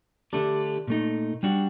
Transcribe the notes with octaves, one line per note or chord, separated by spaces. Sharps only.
D3 A3 D4 G4
A#2 A3 D#4
G3 D4 F#4